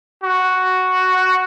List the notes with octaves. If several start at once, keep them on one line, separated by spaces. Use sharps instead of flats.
F#4